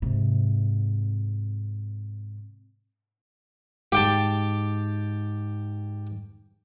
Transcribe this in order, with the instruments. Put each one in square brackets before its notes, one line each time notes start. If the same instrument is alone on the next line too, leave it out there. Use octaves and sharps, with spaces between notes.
[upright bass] G#2 C3
[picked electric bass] G#2 [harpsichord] G4 G5 A5